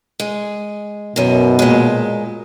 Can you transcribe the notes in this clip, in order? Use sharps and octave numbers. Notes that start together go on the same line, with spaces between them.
G#3
F#2 B2 D#3
A#2 G#3